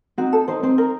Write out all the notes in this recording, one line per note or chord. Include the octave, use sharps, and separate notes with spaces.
C4 D#4 F#4
A4
C4 D#4 C5
C4 D#4 C5
A#4